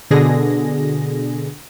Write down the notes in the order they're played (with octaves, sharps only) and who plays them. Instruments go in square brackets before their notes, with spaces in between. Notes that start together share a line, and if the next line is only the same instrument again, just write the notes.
[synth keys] B2 D3 G#4 A#6